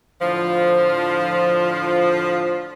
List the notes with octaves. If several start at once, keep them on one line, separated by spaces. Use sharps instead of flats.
A2 D3 F3